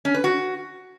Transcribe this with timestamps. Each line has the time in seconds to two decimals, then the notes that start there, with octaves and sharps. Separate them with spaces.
0.05 C#4
0.14 B4
0.24 F#4